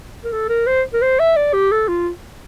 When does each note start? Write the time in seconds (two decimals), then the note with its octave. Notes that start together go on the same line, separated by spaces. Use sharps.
0.24 A#4
0.32 A4
0.49 A#4
0.67 C5
0.94 A#4
1.02 C5
1.19 E5
1.36 D5
1.53 G4
1.71 A4
1.88 F4